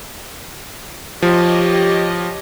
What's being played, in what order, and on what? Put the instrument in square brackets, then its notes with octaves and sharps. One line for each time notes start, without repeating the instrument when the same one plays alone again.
[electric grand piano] F3 [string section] G4 C#5 D#5